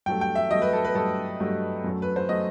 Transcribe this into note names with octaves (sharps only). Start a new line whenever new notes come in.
G2 F#3 A3 G5
G5
E5
G2 F#3 A3 D#5
B4
A4
B4
G2 F#3 A3 A4
G2 F#3 A3
F#2 F#3 A3
B4
C5
F#3 A3 D#5